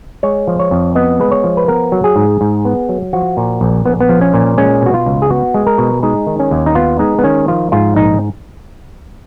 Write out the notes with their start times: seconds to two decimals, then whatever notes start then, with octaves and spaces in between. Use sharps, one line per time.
0.23 G#3 C#5
0.47 F3
0.59 C#5
0.71 F2
0.95 B3 D#5
1.20 G#3 B4
1.31 C#5
1.44 F3
1.57 B4
1.68 B3 A#4
1.92 F#3
2.04 G#4
2.16 G#2
2.41 G#2
2.65 B3
2.89 F#3
3.13 F3 F#4
3.37 A#2
3.61 A#1
3.86 A#1 B3
4.00 B3
4.09 F3
4.21 C#4
4.34 A#2
4.58 G#3 C#4
4.82 B2 F#4
4.94 F4
5.06 C#2
5.22 G#4
5.30 B3 F#4
5.54 G#3
5.67 A#4
5.78 B2
6.03 G#3 D#4
6.27 D#3
6.39 C#4
6.51 D#2
6.66 D#4
6.75 B3 F4
6.99 G#3 D#4
7.19 B3
7.23 D#3 C#4
7.48 F3 F4
7.72 G#2 F4
7.96 A#1 D#4